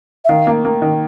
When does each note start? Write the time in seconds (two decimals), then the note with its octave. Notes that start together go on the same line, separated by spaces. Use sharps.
0.25 E5
0.29 D#3 F5
0.47 A#3
0.65 A#3
0.82 D#3